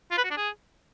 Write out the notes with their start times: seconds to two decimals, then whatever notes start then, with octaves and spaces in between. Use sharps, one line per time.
0.11 F4
0.18 B4
0.24 F#4
0.31 D4
0.37 G#4